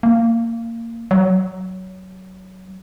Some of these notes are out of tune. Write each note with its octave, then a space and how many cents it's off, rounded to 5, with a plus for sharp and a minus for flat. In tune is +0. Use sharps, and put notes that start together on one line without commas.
A#3 -20
F#3 +15